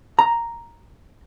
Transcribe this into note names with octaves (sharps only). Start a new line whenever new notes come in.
A#5